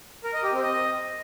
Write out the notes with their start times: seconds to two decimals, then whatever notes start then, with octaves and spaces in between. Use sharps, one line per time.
0.24 A#4
0.33 D#5
0.43 G4
0.53 C4
0.62 D#5